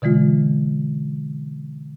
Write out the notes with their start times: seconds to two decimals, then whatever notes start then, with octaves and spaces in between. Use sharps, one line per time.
0.02 B2 D3 E3 G#3 F4